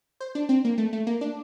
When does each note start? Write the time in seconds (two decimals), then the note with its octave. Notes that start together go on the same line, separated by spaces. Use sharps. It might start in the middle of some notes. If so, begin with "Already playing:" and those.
0.20 C5
0.35 D4
0.49 C4
0.65 A#3
0.78 A3
0.93 A3
1.07 A#3
1.21 D4